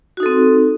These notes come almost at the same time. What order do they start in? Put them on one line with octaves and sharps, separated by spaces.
F#4 D#4 A4 C4